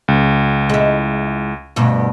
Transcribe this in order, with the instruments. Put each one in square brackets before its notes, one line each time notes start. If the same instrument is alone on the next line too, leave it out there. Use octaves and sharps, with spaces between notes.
[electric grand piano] C#2
[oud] G#3 E4
D2 G2 B2